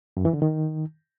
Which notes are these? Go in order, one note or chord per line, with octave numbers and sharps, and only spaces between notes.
F#2
E3
D3
D#3